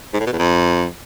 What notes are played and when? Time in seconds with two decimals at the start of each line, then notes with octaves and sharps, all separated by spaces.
0.14 G#2
0.20 A2
0.26 B2
0.33 E2
0.39 F2